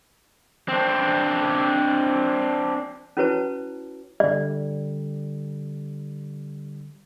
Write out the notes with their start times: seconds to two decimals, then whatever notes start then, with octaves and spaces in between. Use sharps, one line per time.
0.69 C4 D4
3.17 C#4 E4 F#4 B4 C#5 A5
4.20 D3 G3 D5